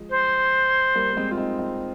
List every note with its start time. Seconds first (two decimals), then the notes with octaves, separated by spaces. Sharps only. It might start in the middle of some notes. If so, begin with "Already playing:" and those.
Already playing: F3 G#3
0.10 C5
0.95 G3 A#3
1.13 A#3
1.17 G#3 C4
1.31 F4
1.37 C4 D#4
1.59 C4 D#4